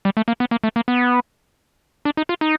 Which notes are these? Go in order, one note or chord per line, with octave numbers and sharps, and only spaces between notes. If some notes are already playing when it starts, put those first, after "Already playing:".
G3
A3
A#3
B3
A#3
A3
A#3
B3
D4
D#4
F4
D#4